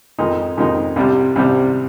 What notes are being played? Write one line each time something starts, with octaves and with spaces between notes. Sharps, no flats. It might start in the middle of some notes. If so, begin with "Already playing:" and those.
F2 D#3 G#3 D#4
F2 D#3 G#3 D#4
C2 C3 G3
C2 C3 G3